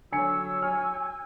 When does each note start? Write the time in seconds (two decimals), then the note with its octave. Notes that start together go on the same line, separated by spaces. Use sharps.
0.12 D3 F#3 C#5 G#5 E6 C#7
0.62 G#5 F6